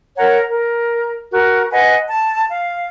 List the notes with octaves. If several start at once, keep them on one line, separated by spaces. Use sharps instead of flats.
A#4 C#5 F#5 A#5
A#4
F#4 A#4
B4 D#5 F#5 G#5
A5
F5